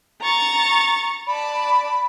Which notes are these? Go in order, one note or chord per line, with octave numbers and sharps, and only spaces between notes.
A#5 C#6 A6
D5 A5 B5